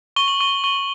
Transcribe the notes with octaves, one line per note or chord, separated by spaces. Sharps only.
C#6 G7
F#7
C#6
C#6 G7